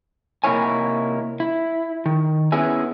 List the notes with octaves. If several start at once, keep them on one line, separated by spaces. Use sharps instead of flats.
C3 A#3 D#4 E4 C#5 G#5
E4
D#3
B3 C#4 E4 G#4 E5 G#5